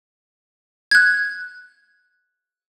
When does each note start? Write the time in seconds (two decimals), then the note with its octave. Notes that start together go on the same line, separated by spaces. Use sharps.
0.91 F#6 G#6